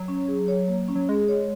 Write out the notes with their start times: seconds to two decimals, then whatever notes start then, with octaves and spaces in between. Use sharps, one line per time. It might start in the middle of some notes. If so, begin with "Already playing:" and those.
Already playing: F#3
0.08 C#4
0.28 G#4
0.48 C#5
0.68 A#3
0.89 C#4
0.95 F#3
1.09 G#3 G#4
1.28 C#5